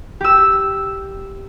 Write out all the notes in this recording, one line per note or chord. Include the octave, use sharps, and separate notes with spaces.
G4 E6